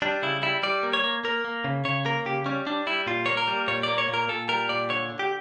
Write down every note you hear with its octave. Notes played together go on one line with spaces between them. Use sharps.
G3 D4
C#3 E4
G3 E4
G3 D5
A#3
C#5
A#3
A#3 A#4
A#3
C#3
C#3 C#5
A#3 A#4
C#3 G4
G3 C#4
G3 D4
G3 E4
A#2 F4
A#3 C#5
A#4
G3
A#2 C#5
A#3 D5
C#5
A#2
A#4
A#2 A4
G3 A#4
A#2 D5
D3 C#5
D3
G4